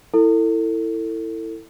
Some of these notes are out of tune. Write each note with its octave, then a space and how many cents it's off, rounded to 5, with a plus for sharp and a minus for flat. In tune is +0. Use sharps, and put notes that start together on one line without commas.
E4 +0 A4 +30